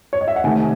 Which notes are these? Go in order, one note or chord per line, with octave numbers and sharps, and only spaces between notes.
C#5
D#5
E5
F#5
C3 D#3 A3 G#5